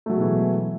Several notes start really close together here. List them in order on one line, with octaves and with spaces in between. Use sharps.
A3 F#3 G#3 B2 E3